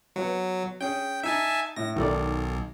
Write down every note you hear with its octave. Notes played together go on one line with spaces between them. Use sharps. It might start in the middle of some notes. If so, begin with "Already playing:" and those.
F#3 B3 F#5
C#4 G#4 G5 G6
D#4 E5 G#5 A5
A2 A#6
B1 D#3 A4 D5